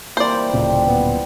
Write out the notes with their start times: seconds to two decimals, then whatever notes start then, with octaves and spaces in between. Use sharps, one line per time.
0.17 C3 E3 G3 A#3 C5 D5
0.54 D1 F2 A#2 C#3 C4
0.87 B3